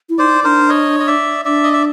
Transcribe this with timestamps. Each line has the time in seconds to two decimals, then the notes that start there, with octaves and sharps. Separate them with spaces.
0.09 E4
0.18 D#4 C5 D5
0.44 D4 A#4 C5
0.69 C#5 D#5
1.00 D#5
1.07 D5 E5
1.45 D4 D5 E5
1.64 D#5
1.73 E5